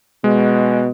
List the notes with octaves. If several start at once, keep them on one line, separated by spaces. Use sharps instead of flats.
B2 G#3